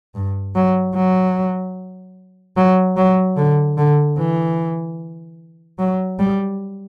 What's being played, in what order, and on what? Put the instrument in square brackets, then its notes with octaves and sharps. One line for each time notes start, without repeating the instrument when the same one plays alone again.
[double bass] G2
F#3
F#3
F#3
F#3
D3
D3
E3
F#3
G3